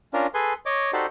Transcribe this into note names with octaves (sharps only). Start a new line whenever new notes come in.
C#4 D4 F4 A#4
G#4 A4 B4 G#5 C6
C#5 D#5 D6
D#4 F#4 G4 A4 C5 D5